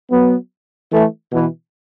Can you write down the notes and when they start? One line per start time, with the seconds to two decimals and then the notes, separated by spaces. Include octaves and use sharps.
0.10 F#3 B3
0.92 E3 A3
1.32 B2 E3